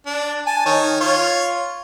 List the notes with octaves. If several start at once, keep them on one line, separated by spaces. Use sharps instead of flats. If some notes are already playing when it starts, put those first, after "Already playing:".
D4
G#5 A5
D#3 C#5
F4 C#5